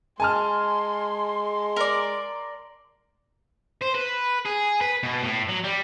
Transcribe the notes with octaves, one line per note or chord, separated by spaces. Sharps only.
G#3 G#5 A5 C6 F6
A#4 D5
C5
B4
G#4
B4
B2
A2
F#3
G3